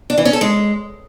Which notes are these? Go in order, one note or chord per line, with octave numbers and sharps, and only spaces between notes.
D4
E3
C#4
A4
G#3